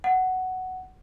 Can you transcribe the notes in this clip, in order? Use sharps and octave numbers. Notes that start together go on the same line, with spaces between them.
F#5